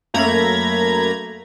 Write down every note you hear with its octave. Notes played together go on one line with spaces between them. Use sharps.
F#2 A3 A#3 A#5 B5 G#6